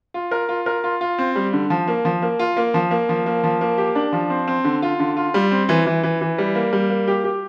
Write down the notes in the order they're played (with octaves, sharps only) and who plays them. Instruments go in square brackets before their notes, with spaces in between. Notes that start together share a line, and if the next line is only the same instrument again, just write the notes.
[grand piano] F4
A#4
F4
A#4
F4
F4
C4
G3
D3
F3
A#3
F3
A#3
F4
A#3
F3
A#3
F3
A#3
F3
A#3
G4
D4
F3
C4
C4
D3
F4
D3
F4
G3
C4
E3
E3
E3
E3
G3
A#3
G3
A#3
G4
G4